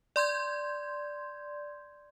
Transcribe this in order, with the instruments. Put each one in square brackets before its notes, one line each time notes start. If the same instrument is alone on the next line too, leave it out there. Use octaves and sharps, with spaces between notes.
[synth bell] D5 C6 G6 G#6